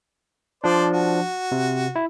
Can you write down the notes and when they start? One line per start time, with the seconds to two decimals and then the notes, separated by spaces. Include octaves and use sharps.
0.64 F3 D4 C5 D5
0.92 F#4
1.52 C3
1.96 E4